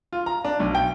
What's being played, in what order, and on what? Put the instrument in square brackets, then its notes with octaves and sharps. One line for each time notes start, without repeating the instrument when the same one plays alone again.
[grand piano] F4
A#5
D4
B1
G5